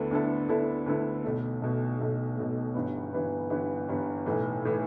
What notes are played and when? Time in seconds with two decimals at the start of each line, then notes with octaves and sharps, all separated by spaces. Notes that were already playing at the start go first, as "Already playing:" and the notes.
Already playing: D2 D3 B3 E4 A4
0.11 D2 D3 B3 E4 A4
0.48 D2 D3 B3 E4 A4
0.86 D2 D3 B3 E4 A4
1.24 B1 B2 A3
1.61 B1 B2 A3
2.00 B1 B2 A3
2.37 B1 B2 A3
2.74 G1 G2 E3 B3
3.13 G1 G2 E3 B3
3.50 G1 G2 E3 B3
3.88 G1 G2 E3 B3
4.26 B1 A2 E3
4.65 A2 E3